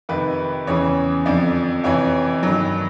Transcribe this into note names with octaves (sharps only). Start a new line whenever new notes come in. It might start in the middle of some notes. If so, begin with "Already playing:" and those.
F2 C3 D#3 B4
E2 C#3 E3 C#5
F2 D3 F3 D5
F2 C3 E3 C#5
G2 D#3 F#3